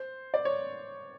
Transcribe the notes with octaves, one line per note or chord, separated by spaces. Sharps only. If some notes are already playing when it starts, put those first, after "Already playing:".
Already playing: C5
D5
C#5